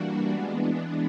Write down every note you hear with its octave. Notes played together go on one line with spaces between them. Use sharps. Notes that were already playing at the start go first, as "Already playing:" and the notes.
Already playing: E3 G3 A#3 D4 F#4
E3 G#3 B3 D4